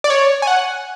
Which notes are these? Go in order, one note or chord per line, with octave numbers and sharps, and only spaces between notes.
D5
C#5
G#5
F#5